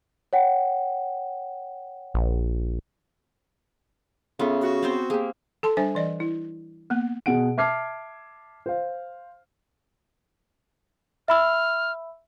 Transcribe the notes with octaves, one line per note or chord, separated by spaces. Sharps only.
C#5 F#5 G5
A#1
C#3 B3 F4 A4 E5
F#4
B3 C4 C5
A#3 G4 G#4
A4 A5 C6
G3 D4 C5 E5 G#5
E3 D5 D#5
E4
A#3 B3
B2 G#4 F#5 D7
E5 A5 D6 F6 G#6 C7
C5 F5
E5 B5 E6 F6